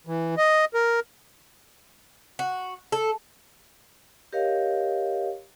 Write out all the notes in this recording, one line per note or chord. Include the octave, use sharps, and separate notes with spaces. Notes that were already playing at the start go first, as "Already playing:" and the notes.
E3
D#5
A#4
F#4
A4
G4 A#4 C#5 D#5 F5